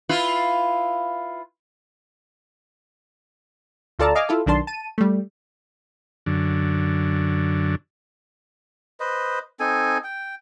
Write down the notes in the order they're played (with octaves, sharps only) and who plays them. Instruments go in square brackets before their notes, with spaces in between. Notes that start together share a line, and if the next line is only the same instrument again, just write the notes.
[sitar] E4 F4 B4
[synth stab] D2 F4 A4 D5 A5 A#5
D#5 F5 G#5 D6 F6
E4 F4 A4
B1 D#3 D4 A5 C6
A5 D#7
G3 A3
[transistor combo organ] F#2 D3
[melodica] B4 C5 D#5
C4 D#4 A4 G#5
G5